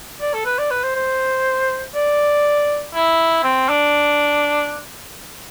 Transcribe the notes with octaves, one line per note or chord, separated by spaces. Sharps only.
D5
A4
B4
D5
B4
C5
C5
D5
E4
C4
D4